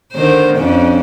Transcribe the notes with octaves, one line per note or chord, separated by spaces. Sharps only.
D3 D#3 C5
F2 C#4 D4